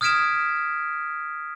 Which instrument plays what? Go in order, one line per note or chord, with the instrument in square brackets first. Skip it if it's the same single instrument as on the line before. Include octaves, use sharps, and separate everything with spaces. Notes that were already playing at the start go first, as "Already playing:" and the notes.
[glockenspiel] D#6 F6 G#6 B6 D7 E7